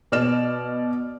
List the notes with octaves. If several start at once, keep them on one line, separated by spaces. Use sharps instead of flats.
B2 D5 F6 E7